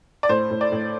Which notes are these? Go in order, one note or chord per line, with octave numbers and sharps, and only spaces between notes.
D5
A2 C5
A2
D5
A2